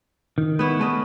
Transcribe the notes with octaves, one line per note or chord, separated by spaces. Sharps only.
D#3
B3 E4 C#5
A3 C#4 D#5